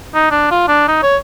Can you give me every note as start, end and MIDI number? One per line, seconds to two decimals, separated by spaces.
0.14 0.26 63
0.31 0.50 62
0.51 0.67 65
0.68 0.85 62
0.88 1.02 63
1.03 1.17 73